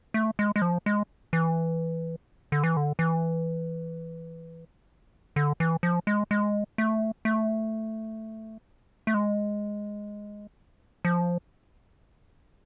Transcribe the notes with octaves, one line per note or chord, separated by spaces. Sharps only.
A3
G#3
G#3
F3
G#3
E3
D3
E3
D3
E3
D3
E3
F3
G#3
G#3
A3
A3
A3
G#3
F3